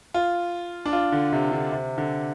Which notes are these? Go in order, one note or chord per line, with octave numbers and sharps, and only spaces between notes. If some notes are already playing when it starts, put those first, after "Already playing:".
F4
D4
F4
D3
C3
D3
C3
D3